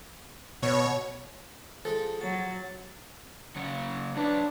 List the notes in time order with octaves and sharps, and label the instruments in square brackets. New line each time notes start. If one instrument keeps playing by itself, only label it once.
[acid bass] B2 [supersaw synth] C#5
[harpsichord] F3 G#3 [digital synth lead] A4
[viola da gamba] F#3 [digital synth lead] A6
[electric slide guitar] C#3 F#3 F#4
[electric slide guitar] F#3 B4 [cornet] D4